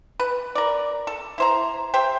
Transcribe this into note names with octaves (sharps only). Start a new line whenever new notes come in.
B4
A#4 D5
A4
E4 C5 A#5
G4 C5 E5 G5